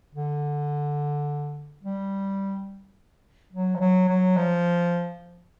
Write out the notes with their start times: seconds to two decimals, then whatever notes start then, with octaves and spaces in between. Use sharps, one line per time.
0.15 D3
1.83 G3
3.53 F#3
3.75 F3
3.80 F#3
4.09 F#3
4.37 F3